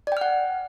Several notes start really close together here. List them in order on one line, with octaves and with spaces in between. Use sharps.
D5 G5 F6 F#5